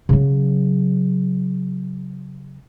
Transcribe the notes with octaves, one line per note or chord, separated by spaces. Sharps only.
C#3 F#3